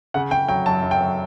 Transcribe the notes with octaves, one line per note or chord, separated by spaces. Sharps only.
C#3 F#5
C#3 G5
F#3 G5
F#2 A5
F#2
G5
F#3